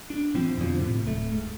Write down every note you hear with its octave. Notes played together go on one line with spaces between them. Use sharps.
D4
A#2 E3 F3 C4
F2 B2 D3 F3
A2 C3
D1 A3
G#2